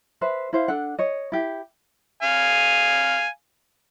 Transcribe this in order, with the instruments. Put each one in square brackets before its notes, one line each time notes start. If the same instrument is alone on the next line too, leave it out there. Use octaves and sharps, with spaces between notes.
[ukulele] B4 C5 E5
E4 C5 F5
D4 A4 F#5
C#5 D#5
E4 G4
[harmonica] F5 G#5